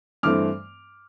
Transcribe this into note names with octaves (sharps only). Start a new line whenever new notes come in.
G2 E3 A3 C4 D6 F6